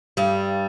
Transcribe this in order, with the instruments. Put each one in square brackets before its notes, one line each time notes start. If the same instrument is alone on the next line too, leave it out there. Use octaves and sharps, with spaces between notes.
[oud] G2 G3